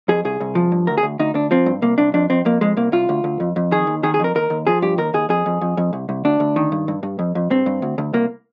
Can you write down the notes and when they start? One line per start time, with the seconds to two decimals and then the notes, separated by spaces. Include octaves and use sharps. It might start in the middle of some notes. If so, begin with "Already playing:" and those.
0.08 F2 G#4
0.25 C2 G#4
0.40 C2
0.55 F3
0.72 G2
0.87 D2 A#4
0.98 G#4
1.03 D2
1.19 D2 D#4
1.35 D2 D4
1.51 F3 C4
1.66 G2
1.82 C2 A#3
1.98 C2 D4
2.14 F2 D4
2.30 F2 C4
2.45 F2 A#3
2.61 F2 G#3
2.77 C2 A#3
2.92 C2 F4
3.09 D2
3.24 D2
3.40 F2
3.56 F2
3.71 D#3 G#4
3.87 D#2
4.03 D#3 G#4
4.14 G#4
4.20 F2 A#4
4.35 D#2 A#4
4.50 D#2
4.67 F3 G#4
4.82 G2 G4
4.98 D#2 A#4
5.14 D#2 G#4
5.29 F2 G#4
5.46 F2
5.61 F2
5.77 F2
5.93 C2
6.09 C2
6.25 D2 D4
6.40 D2
6.56 D#3
6.72 G2
6.88 G2
7.03 G2
7.19 F2
7.35 F2
7.50 G2 C4
7.66 G2
7.82 D2
7.98 D2
8.13 C2 A#3